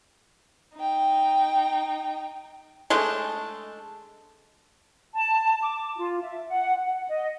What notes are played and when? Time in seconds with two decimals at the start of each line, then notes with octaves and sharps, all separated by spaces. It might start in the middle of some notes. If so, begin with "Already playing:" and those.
0.76 D#4 G5
2.90 G#3 A3 D4
5.15 A5
5.61 D6
5.96 F4
6.22 E5
6.47 F#5
6.86 F#5
7.08 D#5